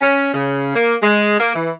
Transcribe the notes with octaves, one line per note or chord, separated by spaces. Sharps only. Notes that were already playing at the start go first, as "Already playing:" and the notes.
C#4
C#3
A#3
G#3
A#3
E3